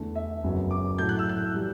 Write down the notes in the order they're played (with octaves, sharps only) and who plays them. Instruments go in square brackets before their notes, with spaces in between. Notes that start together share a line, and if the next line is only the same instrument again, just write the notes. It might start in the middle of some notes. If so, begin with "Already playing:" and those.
Already playing: [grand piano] E2 D3 A3
E5
F#1 F#2 F#3 B3
D6
A2 F#3 A3 E4 G6
F#6
E6
F#6
E3 G3